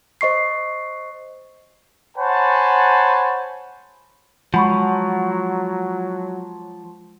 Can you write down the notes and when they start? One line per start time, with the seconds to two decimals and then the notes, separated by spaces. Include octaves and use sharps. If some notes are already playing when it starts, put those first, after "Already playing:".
0.21 C5 D#5 C#6 C7
2.17 C5 C#5 F#5 G#5 A5 B5
4.54 F3 F#3 G#3 F#5 B5 C#6